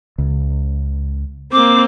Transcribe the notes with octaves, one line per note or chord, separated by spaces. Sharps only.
C#2
A#3 C4 D6